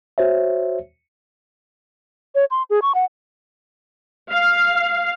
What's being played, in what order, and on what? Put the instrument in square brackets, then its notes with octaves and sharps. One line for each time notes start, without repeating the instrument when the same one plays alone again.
[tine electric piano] F#4 C5 C#5 E5
[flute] C#5
C6
G#4
C#6
F#5
[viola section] F5